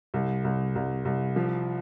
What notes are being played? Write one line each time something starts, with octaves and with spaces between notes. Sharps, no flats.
C2
C2
C2
C2
F3